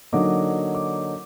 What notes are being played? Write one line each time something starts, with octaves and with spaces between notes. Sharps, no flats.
D3 F#3 A#3 D#4 D6
D6